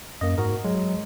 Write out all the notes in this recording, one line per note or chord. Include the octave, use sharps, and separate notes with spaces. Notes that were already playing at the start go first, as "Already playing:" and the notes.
F#2 A#3 D#5
G#2 F#4 A#4
F#3 G#3